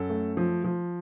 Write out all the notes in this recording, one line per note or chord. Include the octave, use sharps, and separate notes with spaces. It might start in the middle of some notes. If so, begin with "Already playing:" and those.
Already playing: F#2 A4
A3
F3
F3